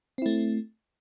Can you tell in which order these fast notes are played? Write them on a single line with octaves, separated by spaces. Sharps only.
C4 E4 A3